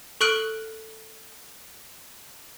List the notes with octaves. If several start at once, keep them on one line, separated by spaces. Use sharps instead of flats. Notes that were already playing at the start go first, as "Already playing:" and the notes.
A4 C#6 F6 F#6 D7 F#7